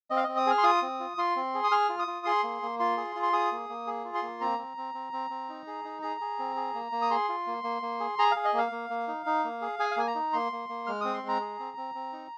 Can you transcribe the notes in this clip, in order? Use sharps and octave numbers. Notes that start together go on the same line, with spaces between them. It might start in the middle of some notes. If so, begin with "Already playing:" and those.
C4 D#5
F5
C4 D#5
D#6
G#4 F6
C6
F4 D#6
C4
F4
F4 C6
C4
G#4
D#6
G#4 F6
F4
D#6
F4
G#4 C6
A#3
A#3
F4 C6
G#4
F4
C6
G#4 D#6
A#3
A#3
G#4
F4
C6
A#3
C4 A#5
C4
C4
C4
C4
C4
D#4
G#4
D#4
G#4 A#5
G#4
C4
G#4
A#3
A#3
D#6
G#4 C6
F4
A#3
A#3
A#3
G#4
G#4 A#5
G#4 F5
D#5
A#3 F5
A#3
A#3
D#4
D#4
A#3
G#4
G#4 G#5
F5
A#3 G#5
A#5
D#4
A#3 C6
A#3
A#3
G#3 F6
C4 D#6
C6
G#3
A#5
G#4
C4
C4
C4
D#4